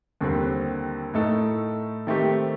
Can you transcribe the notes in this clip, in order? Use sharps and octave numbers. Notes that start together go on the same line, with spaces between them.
D#2 D3 G3 C4 G4
A2 A3 D#4 A4
D#3 A3 C4 G4